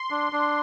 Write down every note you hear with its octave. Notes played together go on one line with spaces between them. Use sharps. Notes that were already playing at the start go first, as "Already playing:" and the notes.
Already playing: C6
D4
D4